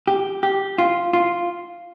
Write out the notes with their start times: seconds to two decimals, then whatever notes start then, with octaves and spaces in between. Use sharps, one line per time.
0.08 G4
0.43 G4
0.78 F4
1.13 F4